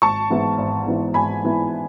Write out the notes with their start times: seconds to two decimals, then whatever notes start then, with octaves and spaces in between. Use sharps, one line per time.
0.02 G#1 A5 C#6
0.30 G#2 E3 B3 E4
0.58 G#1
0.87 G#2 E3 B3 E4
1.14 G#1 G#5 B5
1.43 G#2 E3 B3 E4